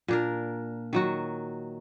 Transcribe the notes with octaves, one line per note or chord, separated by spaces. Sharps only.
A#2 D4 A#4
D#3 F#3 F#4